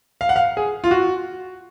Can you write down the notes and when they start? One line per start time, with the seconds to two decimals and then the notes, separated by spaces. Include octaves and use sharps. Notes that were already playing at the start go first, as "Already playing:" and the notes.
0.21 F5
0.29 F#5
0.36 F5
0.57 G#4
0.84 F4
0.91 F#4